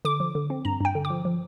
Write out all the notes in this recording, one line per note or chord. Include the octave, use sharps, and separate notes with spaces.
D3 D6
F3
D3
C4
G2 A#5
G2 G5
D3
D6
F3
F3